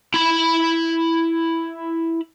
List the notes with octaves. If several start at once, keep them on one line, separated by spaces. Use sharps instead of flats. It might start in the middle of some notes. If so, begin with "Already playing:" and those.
E4 B5